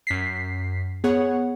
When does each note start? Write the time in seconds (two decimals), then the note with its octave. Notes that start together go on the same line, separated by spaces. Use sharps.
0.07 F#2 B6 C7
1.04 B3 G#4 C#5 F#5